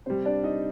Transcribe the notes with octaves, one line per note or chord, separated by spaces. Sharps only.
C3 G3 C5
D4 D5
D#4 D#5